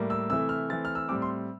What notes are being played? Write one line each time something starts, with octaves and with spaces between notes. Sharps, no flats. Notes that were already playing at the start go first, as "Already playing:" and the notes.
Already playing: A2 G3 A#3
E6
C3 E3 A3 E6
F6
E3 A3 C4 A6
F6
E6
A2 G3 C4 D6
C6